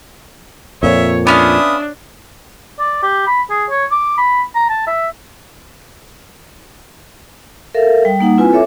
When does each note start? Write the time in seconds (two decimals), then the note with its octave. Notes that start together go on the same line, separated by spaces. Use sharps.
0.83 F2 A#2 C#5 E5
1.27 B3 C#4 D4 E5 F5 D#6
2.80 D5
3.03 G4
3.27 B5
3.50 G#4
3.70 C#5
3.91 D6
4.18 B5
4.55 A#5
4.70 A5
4.87 E5
7.74 A4 A#4 E5 F5
8.05 G3 G5
8.19 G3 A#3 D#4 F#5
8.38 C4 E4 F4 B4 G#5
8.52 A4 C#5 E5 D6